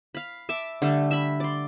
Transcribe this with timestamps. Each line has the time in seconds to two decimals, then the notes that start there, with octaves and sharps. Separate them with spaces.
0.15 F5 B5
0.49 E5 A5 D6
0.82 D3 G3 A3
1.11 E5 B5
1.40 D5 C6